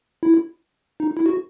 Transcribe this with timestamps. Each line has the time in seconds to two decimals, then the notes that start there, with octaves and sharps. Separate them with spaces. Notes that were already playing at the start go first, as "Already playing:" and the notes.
0.23 E4
1.00 D#4
1.17 E4
1.26 F#4